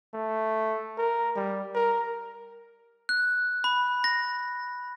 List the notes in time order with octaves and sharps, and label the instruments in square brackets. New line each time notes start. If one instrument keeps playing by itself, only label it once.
[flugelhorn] A3
A#4
G3
A#4
[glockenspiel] F#6
B5
A#6